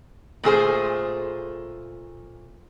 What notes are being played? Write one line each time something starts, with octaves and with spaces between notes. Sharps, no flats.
A#2 A3 G#4 C5